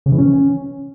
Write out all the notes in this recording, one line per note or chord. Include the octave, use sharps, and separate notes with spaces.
C#3
E3
C#4